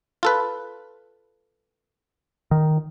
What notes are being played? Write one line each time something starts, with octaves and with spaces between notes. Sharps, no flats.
F4 A4 B4
D#3